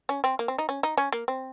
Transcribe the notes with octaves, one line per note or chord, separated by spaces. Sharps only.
C#4
C4
A#3
C4
D#4
C#4
D#4
C#4
A#3
C4